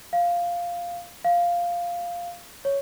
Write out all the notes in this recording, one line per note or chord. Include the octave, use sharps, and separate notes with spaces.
F5
F5
C#5